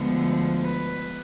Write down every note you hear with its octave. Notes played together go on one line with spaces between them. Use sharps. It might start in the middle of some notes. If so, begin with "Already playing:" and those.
Already playing: D2 D3 F3 G#3 B3
B4